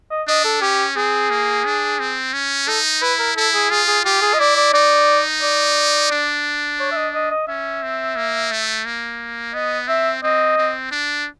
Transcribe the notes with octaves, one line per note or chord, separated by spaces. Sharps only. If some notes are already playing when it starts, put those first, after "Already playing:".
D#5
D4 D#5
A4
C#4 G4
C4 G#4
A#3
D4
C4
C#4
D#4 A4
E4 B4
A#4
E4 A4
G#4
F4 G#4
G#4
F4 G4
G#4
D#5
E4 D5
D5
D#4 D5
D5
D4
C#5
E5
D#5
D#5
D#5
C#4 E5
C4
A#3
A3
A#3
B3 D#5
C4 E5
C4 D#5
C4
D4